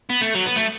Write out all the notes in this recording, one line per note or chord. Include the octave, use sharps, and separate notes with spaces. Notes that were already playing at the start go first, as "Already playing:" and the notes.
B3
A3
F#3
B3
A3